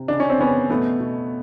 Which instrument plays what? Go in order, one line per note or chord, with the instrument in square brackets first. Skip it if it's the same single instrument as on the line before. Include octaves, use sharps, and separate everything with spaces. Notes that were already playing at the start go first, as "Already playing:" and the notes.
Already playing: [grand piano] C3
C#3 D4
C#4
C4
C#3 B3 C#4
B2 A3 B3
B2